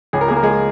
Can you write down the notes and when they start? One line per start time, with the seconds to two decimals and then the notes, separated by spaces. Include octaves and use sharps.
0.13 C#2 G#4
0.21 A#4
0.28 G#4
0.31 A#3
0.36 A#4
0.43 G#3 G#4